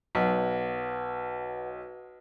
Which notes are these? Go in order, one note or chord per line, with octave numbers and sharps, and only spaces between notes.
B1 B4 F#5